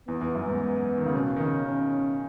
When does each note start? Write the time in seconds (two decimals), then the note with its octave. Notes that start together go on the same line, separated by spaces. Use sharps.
0.08 E2 B3
0.21 E2
0.35 F#2
0.48 G#2
0.97 D#3
1.06 C#3
1.14 B2 C#4
1.36 D#3
1.41 C#3
1.67 C#4